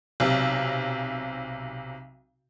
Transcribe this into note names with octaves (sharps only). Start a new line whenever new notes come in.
B1 C3